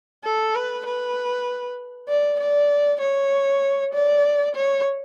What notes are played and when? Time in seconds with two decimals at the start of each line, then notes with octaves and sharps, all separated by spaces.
0.24 A4
0.55 B4
0.86 B4
2.08 D5
2.40 D5
3.00 C#5
3.93 D5
4.55 C#5